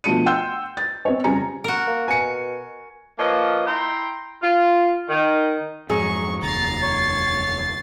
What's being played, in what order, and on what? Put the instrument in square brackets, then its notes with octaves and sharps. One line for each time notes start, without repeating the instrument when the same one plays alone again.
[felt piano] B2 F3 A3 D4 C#7 D#7
F#5 G5 C6 E6 G6
A6
C4 C#5
F2 C#3 G3 G#5 A#5 C#7
[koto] F#4 A#4
[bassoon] A#3
[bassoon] B2 [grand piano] G#5 C#7
[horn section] F3 A#3 B4 C#5 D#5
E4 G5 A#5 C6
F4
D#3
[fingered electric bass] F2 G#2 [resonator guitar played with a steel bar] F#3 G#4 [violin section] C#6
[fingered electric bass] F1 D#2 [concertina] A#5 [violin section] A6 C7
[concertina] C#5